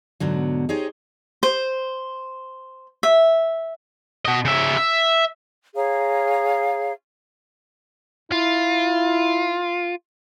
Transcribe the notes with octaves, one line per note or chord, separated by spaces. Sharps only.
G#2 B2 D3 F#3
D#4 G4 G#4 C5 C#5 D#5
C5
E5
B2 D#5
C#3 E5
E5
G#4 C#5 F5 A#5
E4 F4